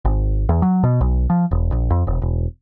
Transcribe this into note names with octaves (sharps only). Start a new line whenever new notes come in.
G#1
E2
F#3
B2
B1
F3
E1
A#1
F2
E1
E1